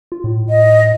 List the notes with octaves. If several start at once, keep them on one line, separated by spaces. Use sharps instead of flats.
F4
A2
D#5